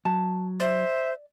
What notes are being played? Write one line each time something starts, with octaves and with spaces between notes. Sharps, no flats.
F#3 A5
C5 D5 E5